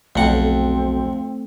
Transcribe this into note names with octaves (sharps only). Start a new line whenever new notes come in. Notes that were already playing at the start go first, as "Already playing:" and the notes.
B1 F2 A3 C4 F#5